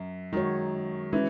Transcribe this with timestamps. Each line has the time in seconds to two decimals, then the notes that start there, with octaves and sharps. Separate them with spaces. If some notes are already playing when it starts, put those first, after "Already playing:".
Already playing: F#2
0.33 D#3 G#3 D#4 F#4 C#5
1.13 E3 G#3 C#4